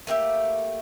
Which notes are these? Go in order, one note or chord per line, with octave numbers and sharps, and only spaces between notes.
A3 A#3 G4 E5